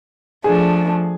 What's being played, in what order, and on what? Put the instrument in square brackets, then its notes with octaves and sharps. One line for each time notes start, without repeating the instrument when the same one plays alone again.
[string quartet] F3 A3 D4 [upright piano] G#4